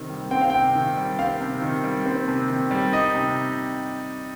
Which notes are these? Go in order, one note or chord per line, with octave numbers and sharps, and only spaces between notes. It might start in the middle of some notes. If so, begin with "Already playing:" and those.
Already playing: C3 D#3 C4
G3
C4 G5
F5
C3 G5
D#3
G3
C4 F5
C3
D#3
G3
C4
C3
D#3
G3
D#4 D#5
C3